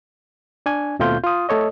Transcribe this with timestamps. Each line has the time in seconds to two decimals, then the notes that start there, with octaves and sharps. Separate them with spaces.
0.66 D4 G#5
0.99 D#2 B2 A3 C4 F4 G6
1.24 F4 D#6
1.49 A3 A4 C#5 D#5